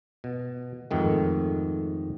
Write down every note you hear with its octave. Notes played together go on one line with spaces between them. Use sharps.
B2
F2 G#2 D#3 A3